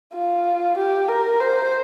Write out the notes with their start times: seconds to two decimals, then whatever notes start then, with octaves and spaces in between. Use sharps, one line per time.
0.13 F4
0.77 G4
1.08 A#4
1.41 C5